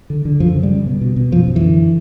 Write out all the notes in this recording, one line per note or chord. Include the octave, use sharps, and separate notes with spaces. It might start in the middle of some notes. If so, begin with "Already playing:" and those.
D3
D3
F#2 F3
C#3
G3
C#3
B2
B2
B2
F#2 F3
F#2
E3
D3